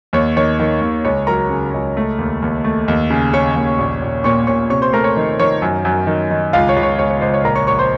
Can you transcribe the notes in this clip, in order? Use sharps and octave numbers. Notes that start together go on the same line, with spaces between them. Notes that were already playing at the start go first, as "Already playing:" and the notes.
D#2 C#5
D#3 C#5
D#3
D#2
C#2 C#5
F#3 A#4 A#5
C#3
C#2
A3
D#2
D#2
A3
D#2
C#3
C#3 C#5 C#6
D#2
A#1
A#1
A#2 C#5 C#6
A#2 C#5 C#6
C3 C#5 C#6
C5 C6
A3 A#4 A#5
C#5
D#3
D#3 C#5
F#2
F#2
D#3
D#3
C#2 F4 F5
C#5
C#2
C#5
C#2 C#5
C#5
C#2 C5
C#5
A#1 A#4 A#5
C#5 C#6
A#1 C#5 C#6
C5 C6